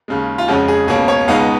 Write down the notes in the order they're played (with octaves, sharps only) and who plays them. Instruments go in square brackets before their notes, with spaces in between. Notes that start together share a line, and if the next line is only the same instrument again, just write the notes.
[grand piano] D#2 C#3 G#3
F4
F2 C#3 G#3 C#4 F#4
G#4
C#2 B2 A#3 C#4 G#4
C#5
C#2 B2 G#3 B3 D#4 F5